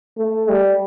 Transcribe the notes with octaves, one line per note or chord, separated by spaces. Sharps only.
A3
G3